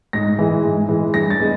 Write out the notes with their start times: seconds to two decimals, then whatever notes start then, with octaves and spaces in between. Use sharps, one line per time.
0.13 G#2 A#6
0.39 E3 G#3
0.64 G#2
0.89 E3 G#3
1.14 G2 A#6
1.30 A6
1.39 G#3 B3